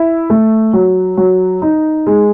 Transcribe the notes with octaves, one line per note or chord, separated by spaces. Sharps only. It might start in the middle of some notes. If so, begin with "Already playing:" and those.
Already playing: E4
A3
F#3
F#3
D#4
G#3